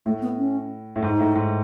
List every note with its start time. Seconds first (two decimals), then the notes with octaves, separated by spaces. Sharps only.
0.06 A2 A3
0.22 B3
0.37 C#4
0.96 A2
1.02 G#2 D#4
1.19 A2
1.35 G#2